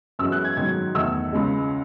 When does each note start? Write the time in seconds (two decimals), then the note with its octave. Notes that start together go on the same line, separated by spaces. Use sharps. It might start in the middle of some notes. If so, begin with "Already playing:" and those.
0.19 F#2 E3 G#3 E6
0.32 F#6
0.44 G#6
0.57 G#2 D#3 F#3 G#6
0.95 E2 D#3 A3 E6
1.32 C#2 C#3 G#3